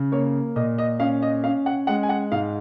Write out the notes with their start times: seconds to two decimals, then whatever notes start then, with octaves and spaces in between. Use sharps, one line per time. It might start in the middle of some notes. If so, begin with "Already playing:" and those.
Already playing: C#3
0.12 A#3 C#5
0.56 A#2 D#5
0.78 D#5
1.00 C#4 F5
1.22 D#5
1.44 C#4 F5
1.66 F#5
1.87 G#3 F#5
2.03 G#5
2.09 F#5
2.32 G#2 F5